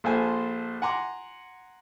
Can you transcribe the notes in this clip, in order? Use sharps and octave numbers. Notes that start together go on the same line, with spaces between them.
A#1 F4 A4 C5 G#5
F#5 G#5 A#5 C6 D6